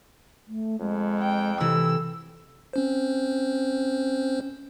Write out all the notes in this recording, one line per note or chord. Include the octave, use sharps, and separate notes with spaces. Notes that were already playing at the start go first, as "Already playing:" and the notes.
A3
F2 G#3
G5
C3 E3 A4 E6
C4 C#4 C5